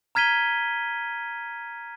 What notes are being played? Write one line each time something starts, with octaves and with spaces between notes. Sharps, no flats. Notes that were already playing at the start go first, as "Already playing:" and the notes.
A#5 F6 G#6 B6 D#7 G7